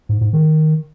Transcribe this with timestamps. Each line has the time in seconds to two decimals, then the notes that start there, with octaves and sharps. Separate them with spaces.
0.09 G#2
0.21 G#2
0.33 D#3